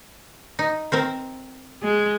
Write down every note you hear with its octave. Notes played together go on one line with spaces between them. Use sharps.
D#4
C4 A#4 C5
G#3